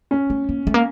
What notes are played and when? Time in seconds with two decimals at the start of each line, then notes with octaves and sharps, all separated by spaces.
0.11 C#4
0.30 A3
0.49 A#3
0.67 A3
0.74 A#3